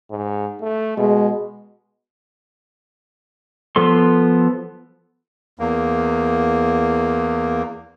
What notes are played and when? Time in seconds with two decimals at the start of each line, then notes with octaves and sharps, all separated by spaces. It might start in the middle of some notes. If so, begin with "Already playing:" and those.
0.11 G#2
0.61 A3
0.97 B2 G#3
3.76 F3 B3 A4 C6
5.59 E2 A#3